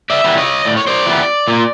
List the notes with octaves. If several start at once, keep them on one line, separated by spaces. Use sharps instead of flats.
D5 E5
E3 G3 B3
C#5 D#5
A2 D5
C#5
C5 D5
E3 G3 B3
A#2